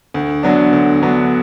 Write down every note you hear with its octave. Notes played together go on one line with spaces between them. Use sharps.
D2
D3 F#3 B3 D4
D2
D3 F#3 B3 D4